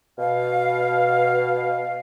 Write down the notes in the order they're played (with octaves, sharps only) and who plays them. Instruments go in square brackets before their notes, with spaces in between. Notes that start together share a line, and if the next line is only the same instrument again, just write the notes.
[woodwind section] B2 F5